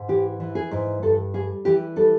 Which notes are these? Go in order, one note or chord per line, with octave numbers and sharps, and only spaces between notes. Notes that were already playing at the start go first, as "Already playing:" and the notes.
Already playing: G#2
E3 G4
E3
G#4
G#2
G2 A4
G3 G#4
E3 G4
G3 A4